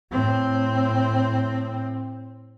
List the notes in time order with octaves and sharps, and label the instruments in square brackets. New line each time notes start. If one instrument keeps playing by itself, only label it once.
[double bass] A2 C4